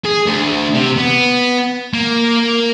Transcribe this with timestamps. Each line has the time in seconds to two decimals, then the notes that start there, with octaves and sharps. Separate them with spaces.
0.05 G#4
0.26 D2
0.75 C3
0.98 B3
1.94 A#3